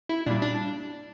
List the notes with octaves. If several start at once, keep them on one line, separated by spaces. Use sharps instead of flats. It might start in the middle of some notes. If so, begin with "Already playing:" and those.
E4
A#2 G3 D4
D4